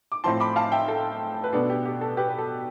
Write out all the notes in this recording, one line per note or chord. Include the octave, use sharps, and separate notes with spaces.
D6
A2 F3 C4 E4 A5 C6
B5 D6
F5 A5
E5 G5
A4
B4
B2 B3 D4 A4
G4
G4
A4
G4 B4
B4
A4